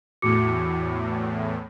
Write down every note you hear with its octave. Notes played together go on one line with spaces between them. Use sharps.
E2 A2 F#4 D6 C#7